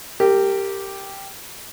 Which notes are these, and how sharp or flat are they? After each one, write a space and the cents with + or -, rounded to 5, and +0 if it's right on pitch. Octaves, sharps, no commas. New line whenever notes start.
G4 +0 A#4 -25